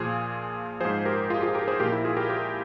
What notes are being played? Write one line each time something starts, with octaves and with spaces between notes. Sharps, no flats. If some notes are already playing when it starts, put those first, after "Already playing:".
Already playing: A#2 F3 F4 G#4
G#2 F3 G#4 C5
G4 A#4
F4 G#4
F4 G#4
G4 A#4
G#4 C5
A#2 F3 G4 A#4
E4 G4
F4 G#4
G4 A#4
G4 A#4